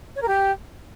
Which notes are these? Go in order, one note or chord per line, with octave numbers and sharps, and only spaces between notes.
C#5
A#4
G4